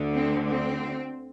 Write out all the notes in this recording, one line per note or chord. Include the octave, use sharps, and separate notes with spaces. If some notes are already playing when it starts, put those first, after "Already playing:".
Already playing: D2 D3
C4
C4